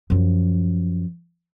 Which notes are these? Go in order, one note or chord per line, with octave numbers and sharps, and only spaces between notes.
F#2 F3